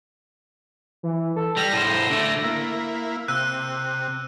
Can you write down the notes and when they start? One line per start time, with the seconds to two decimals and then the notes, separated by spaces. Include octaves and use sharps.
1.03 E3
1.36 A4
1.57 G3 A#6
1.72 A2 C5
2.10 D3 A3
2.44 A#3 E4
3.28 C3 E6 F#6 D#7